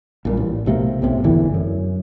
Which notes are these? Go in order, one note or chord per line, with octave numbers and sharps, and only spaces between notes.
A#1 A#2 G3
A1
B1 C3 A3 A#3
B1 A2 C3
G1 E2 D3 E3
F#2